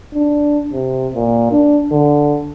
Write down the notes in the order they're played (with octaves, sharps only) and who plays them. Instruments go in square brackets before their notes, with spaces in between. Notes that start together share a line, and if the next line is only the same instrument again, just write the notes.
[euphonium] D4
C3
A#2
D4
D3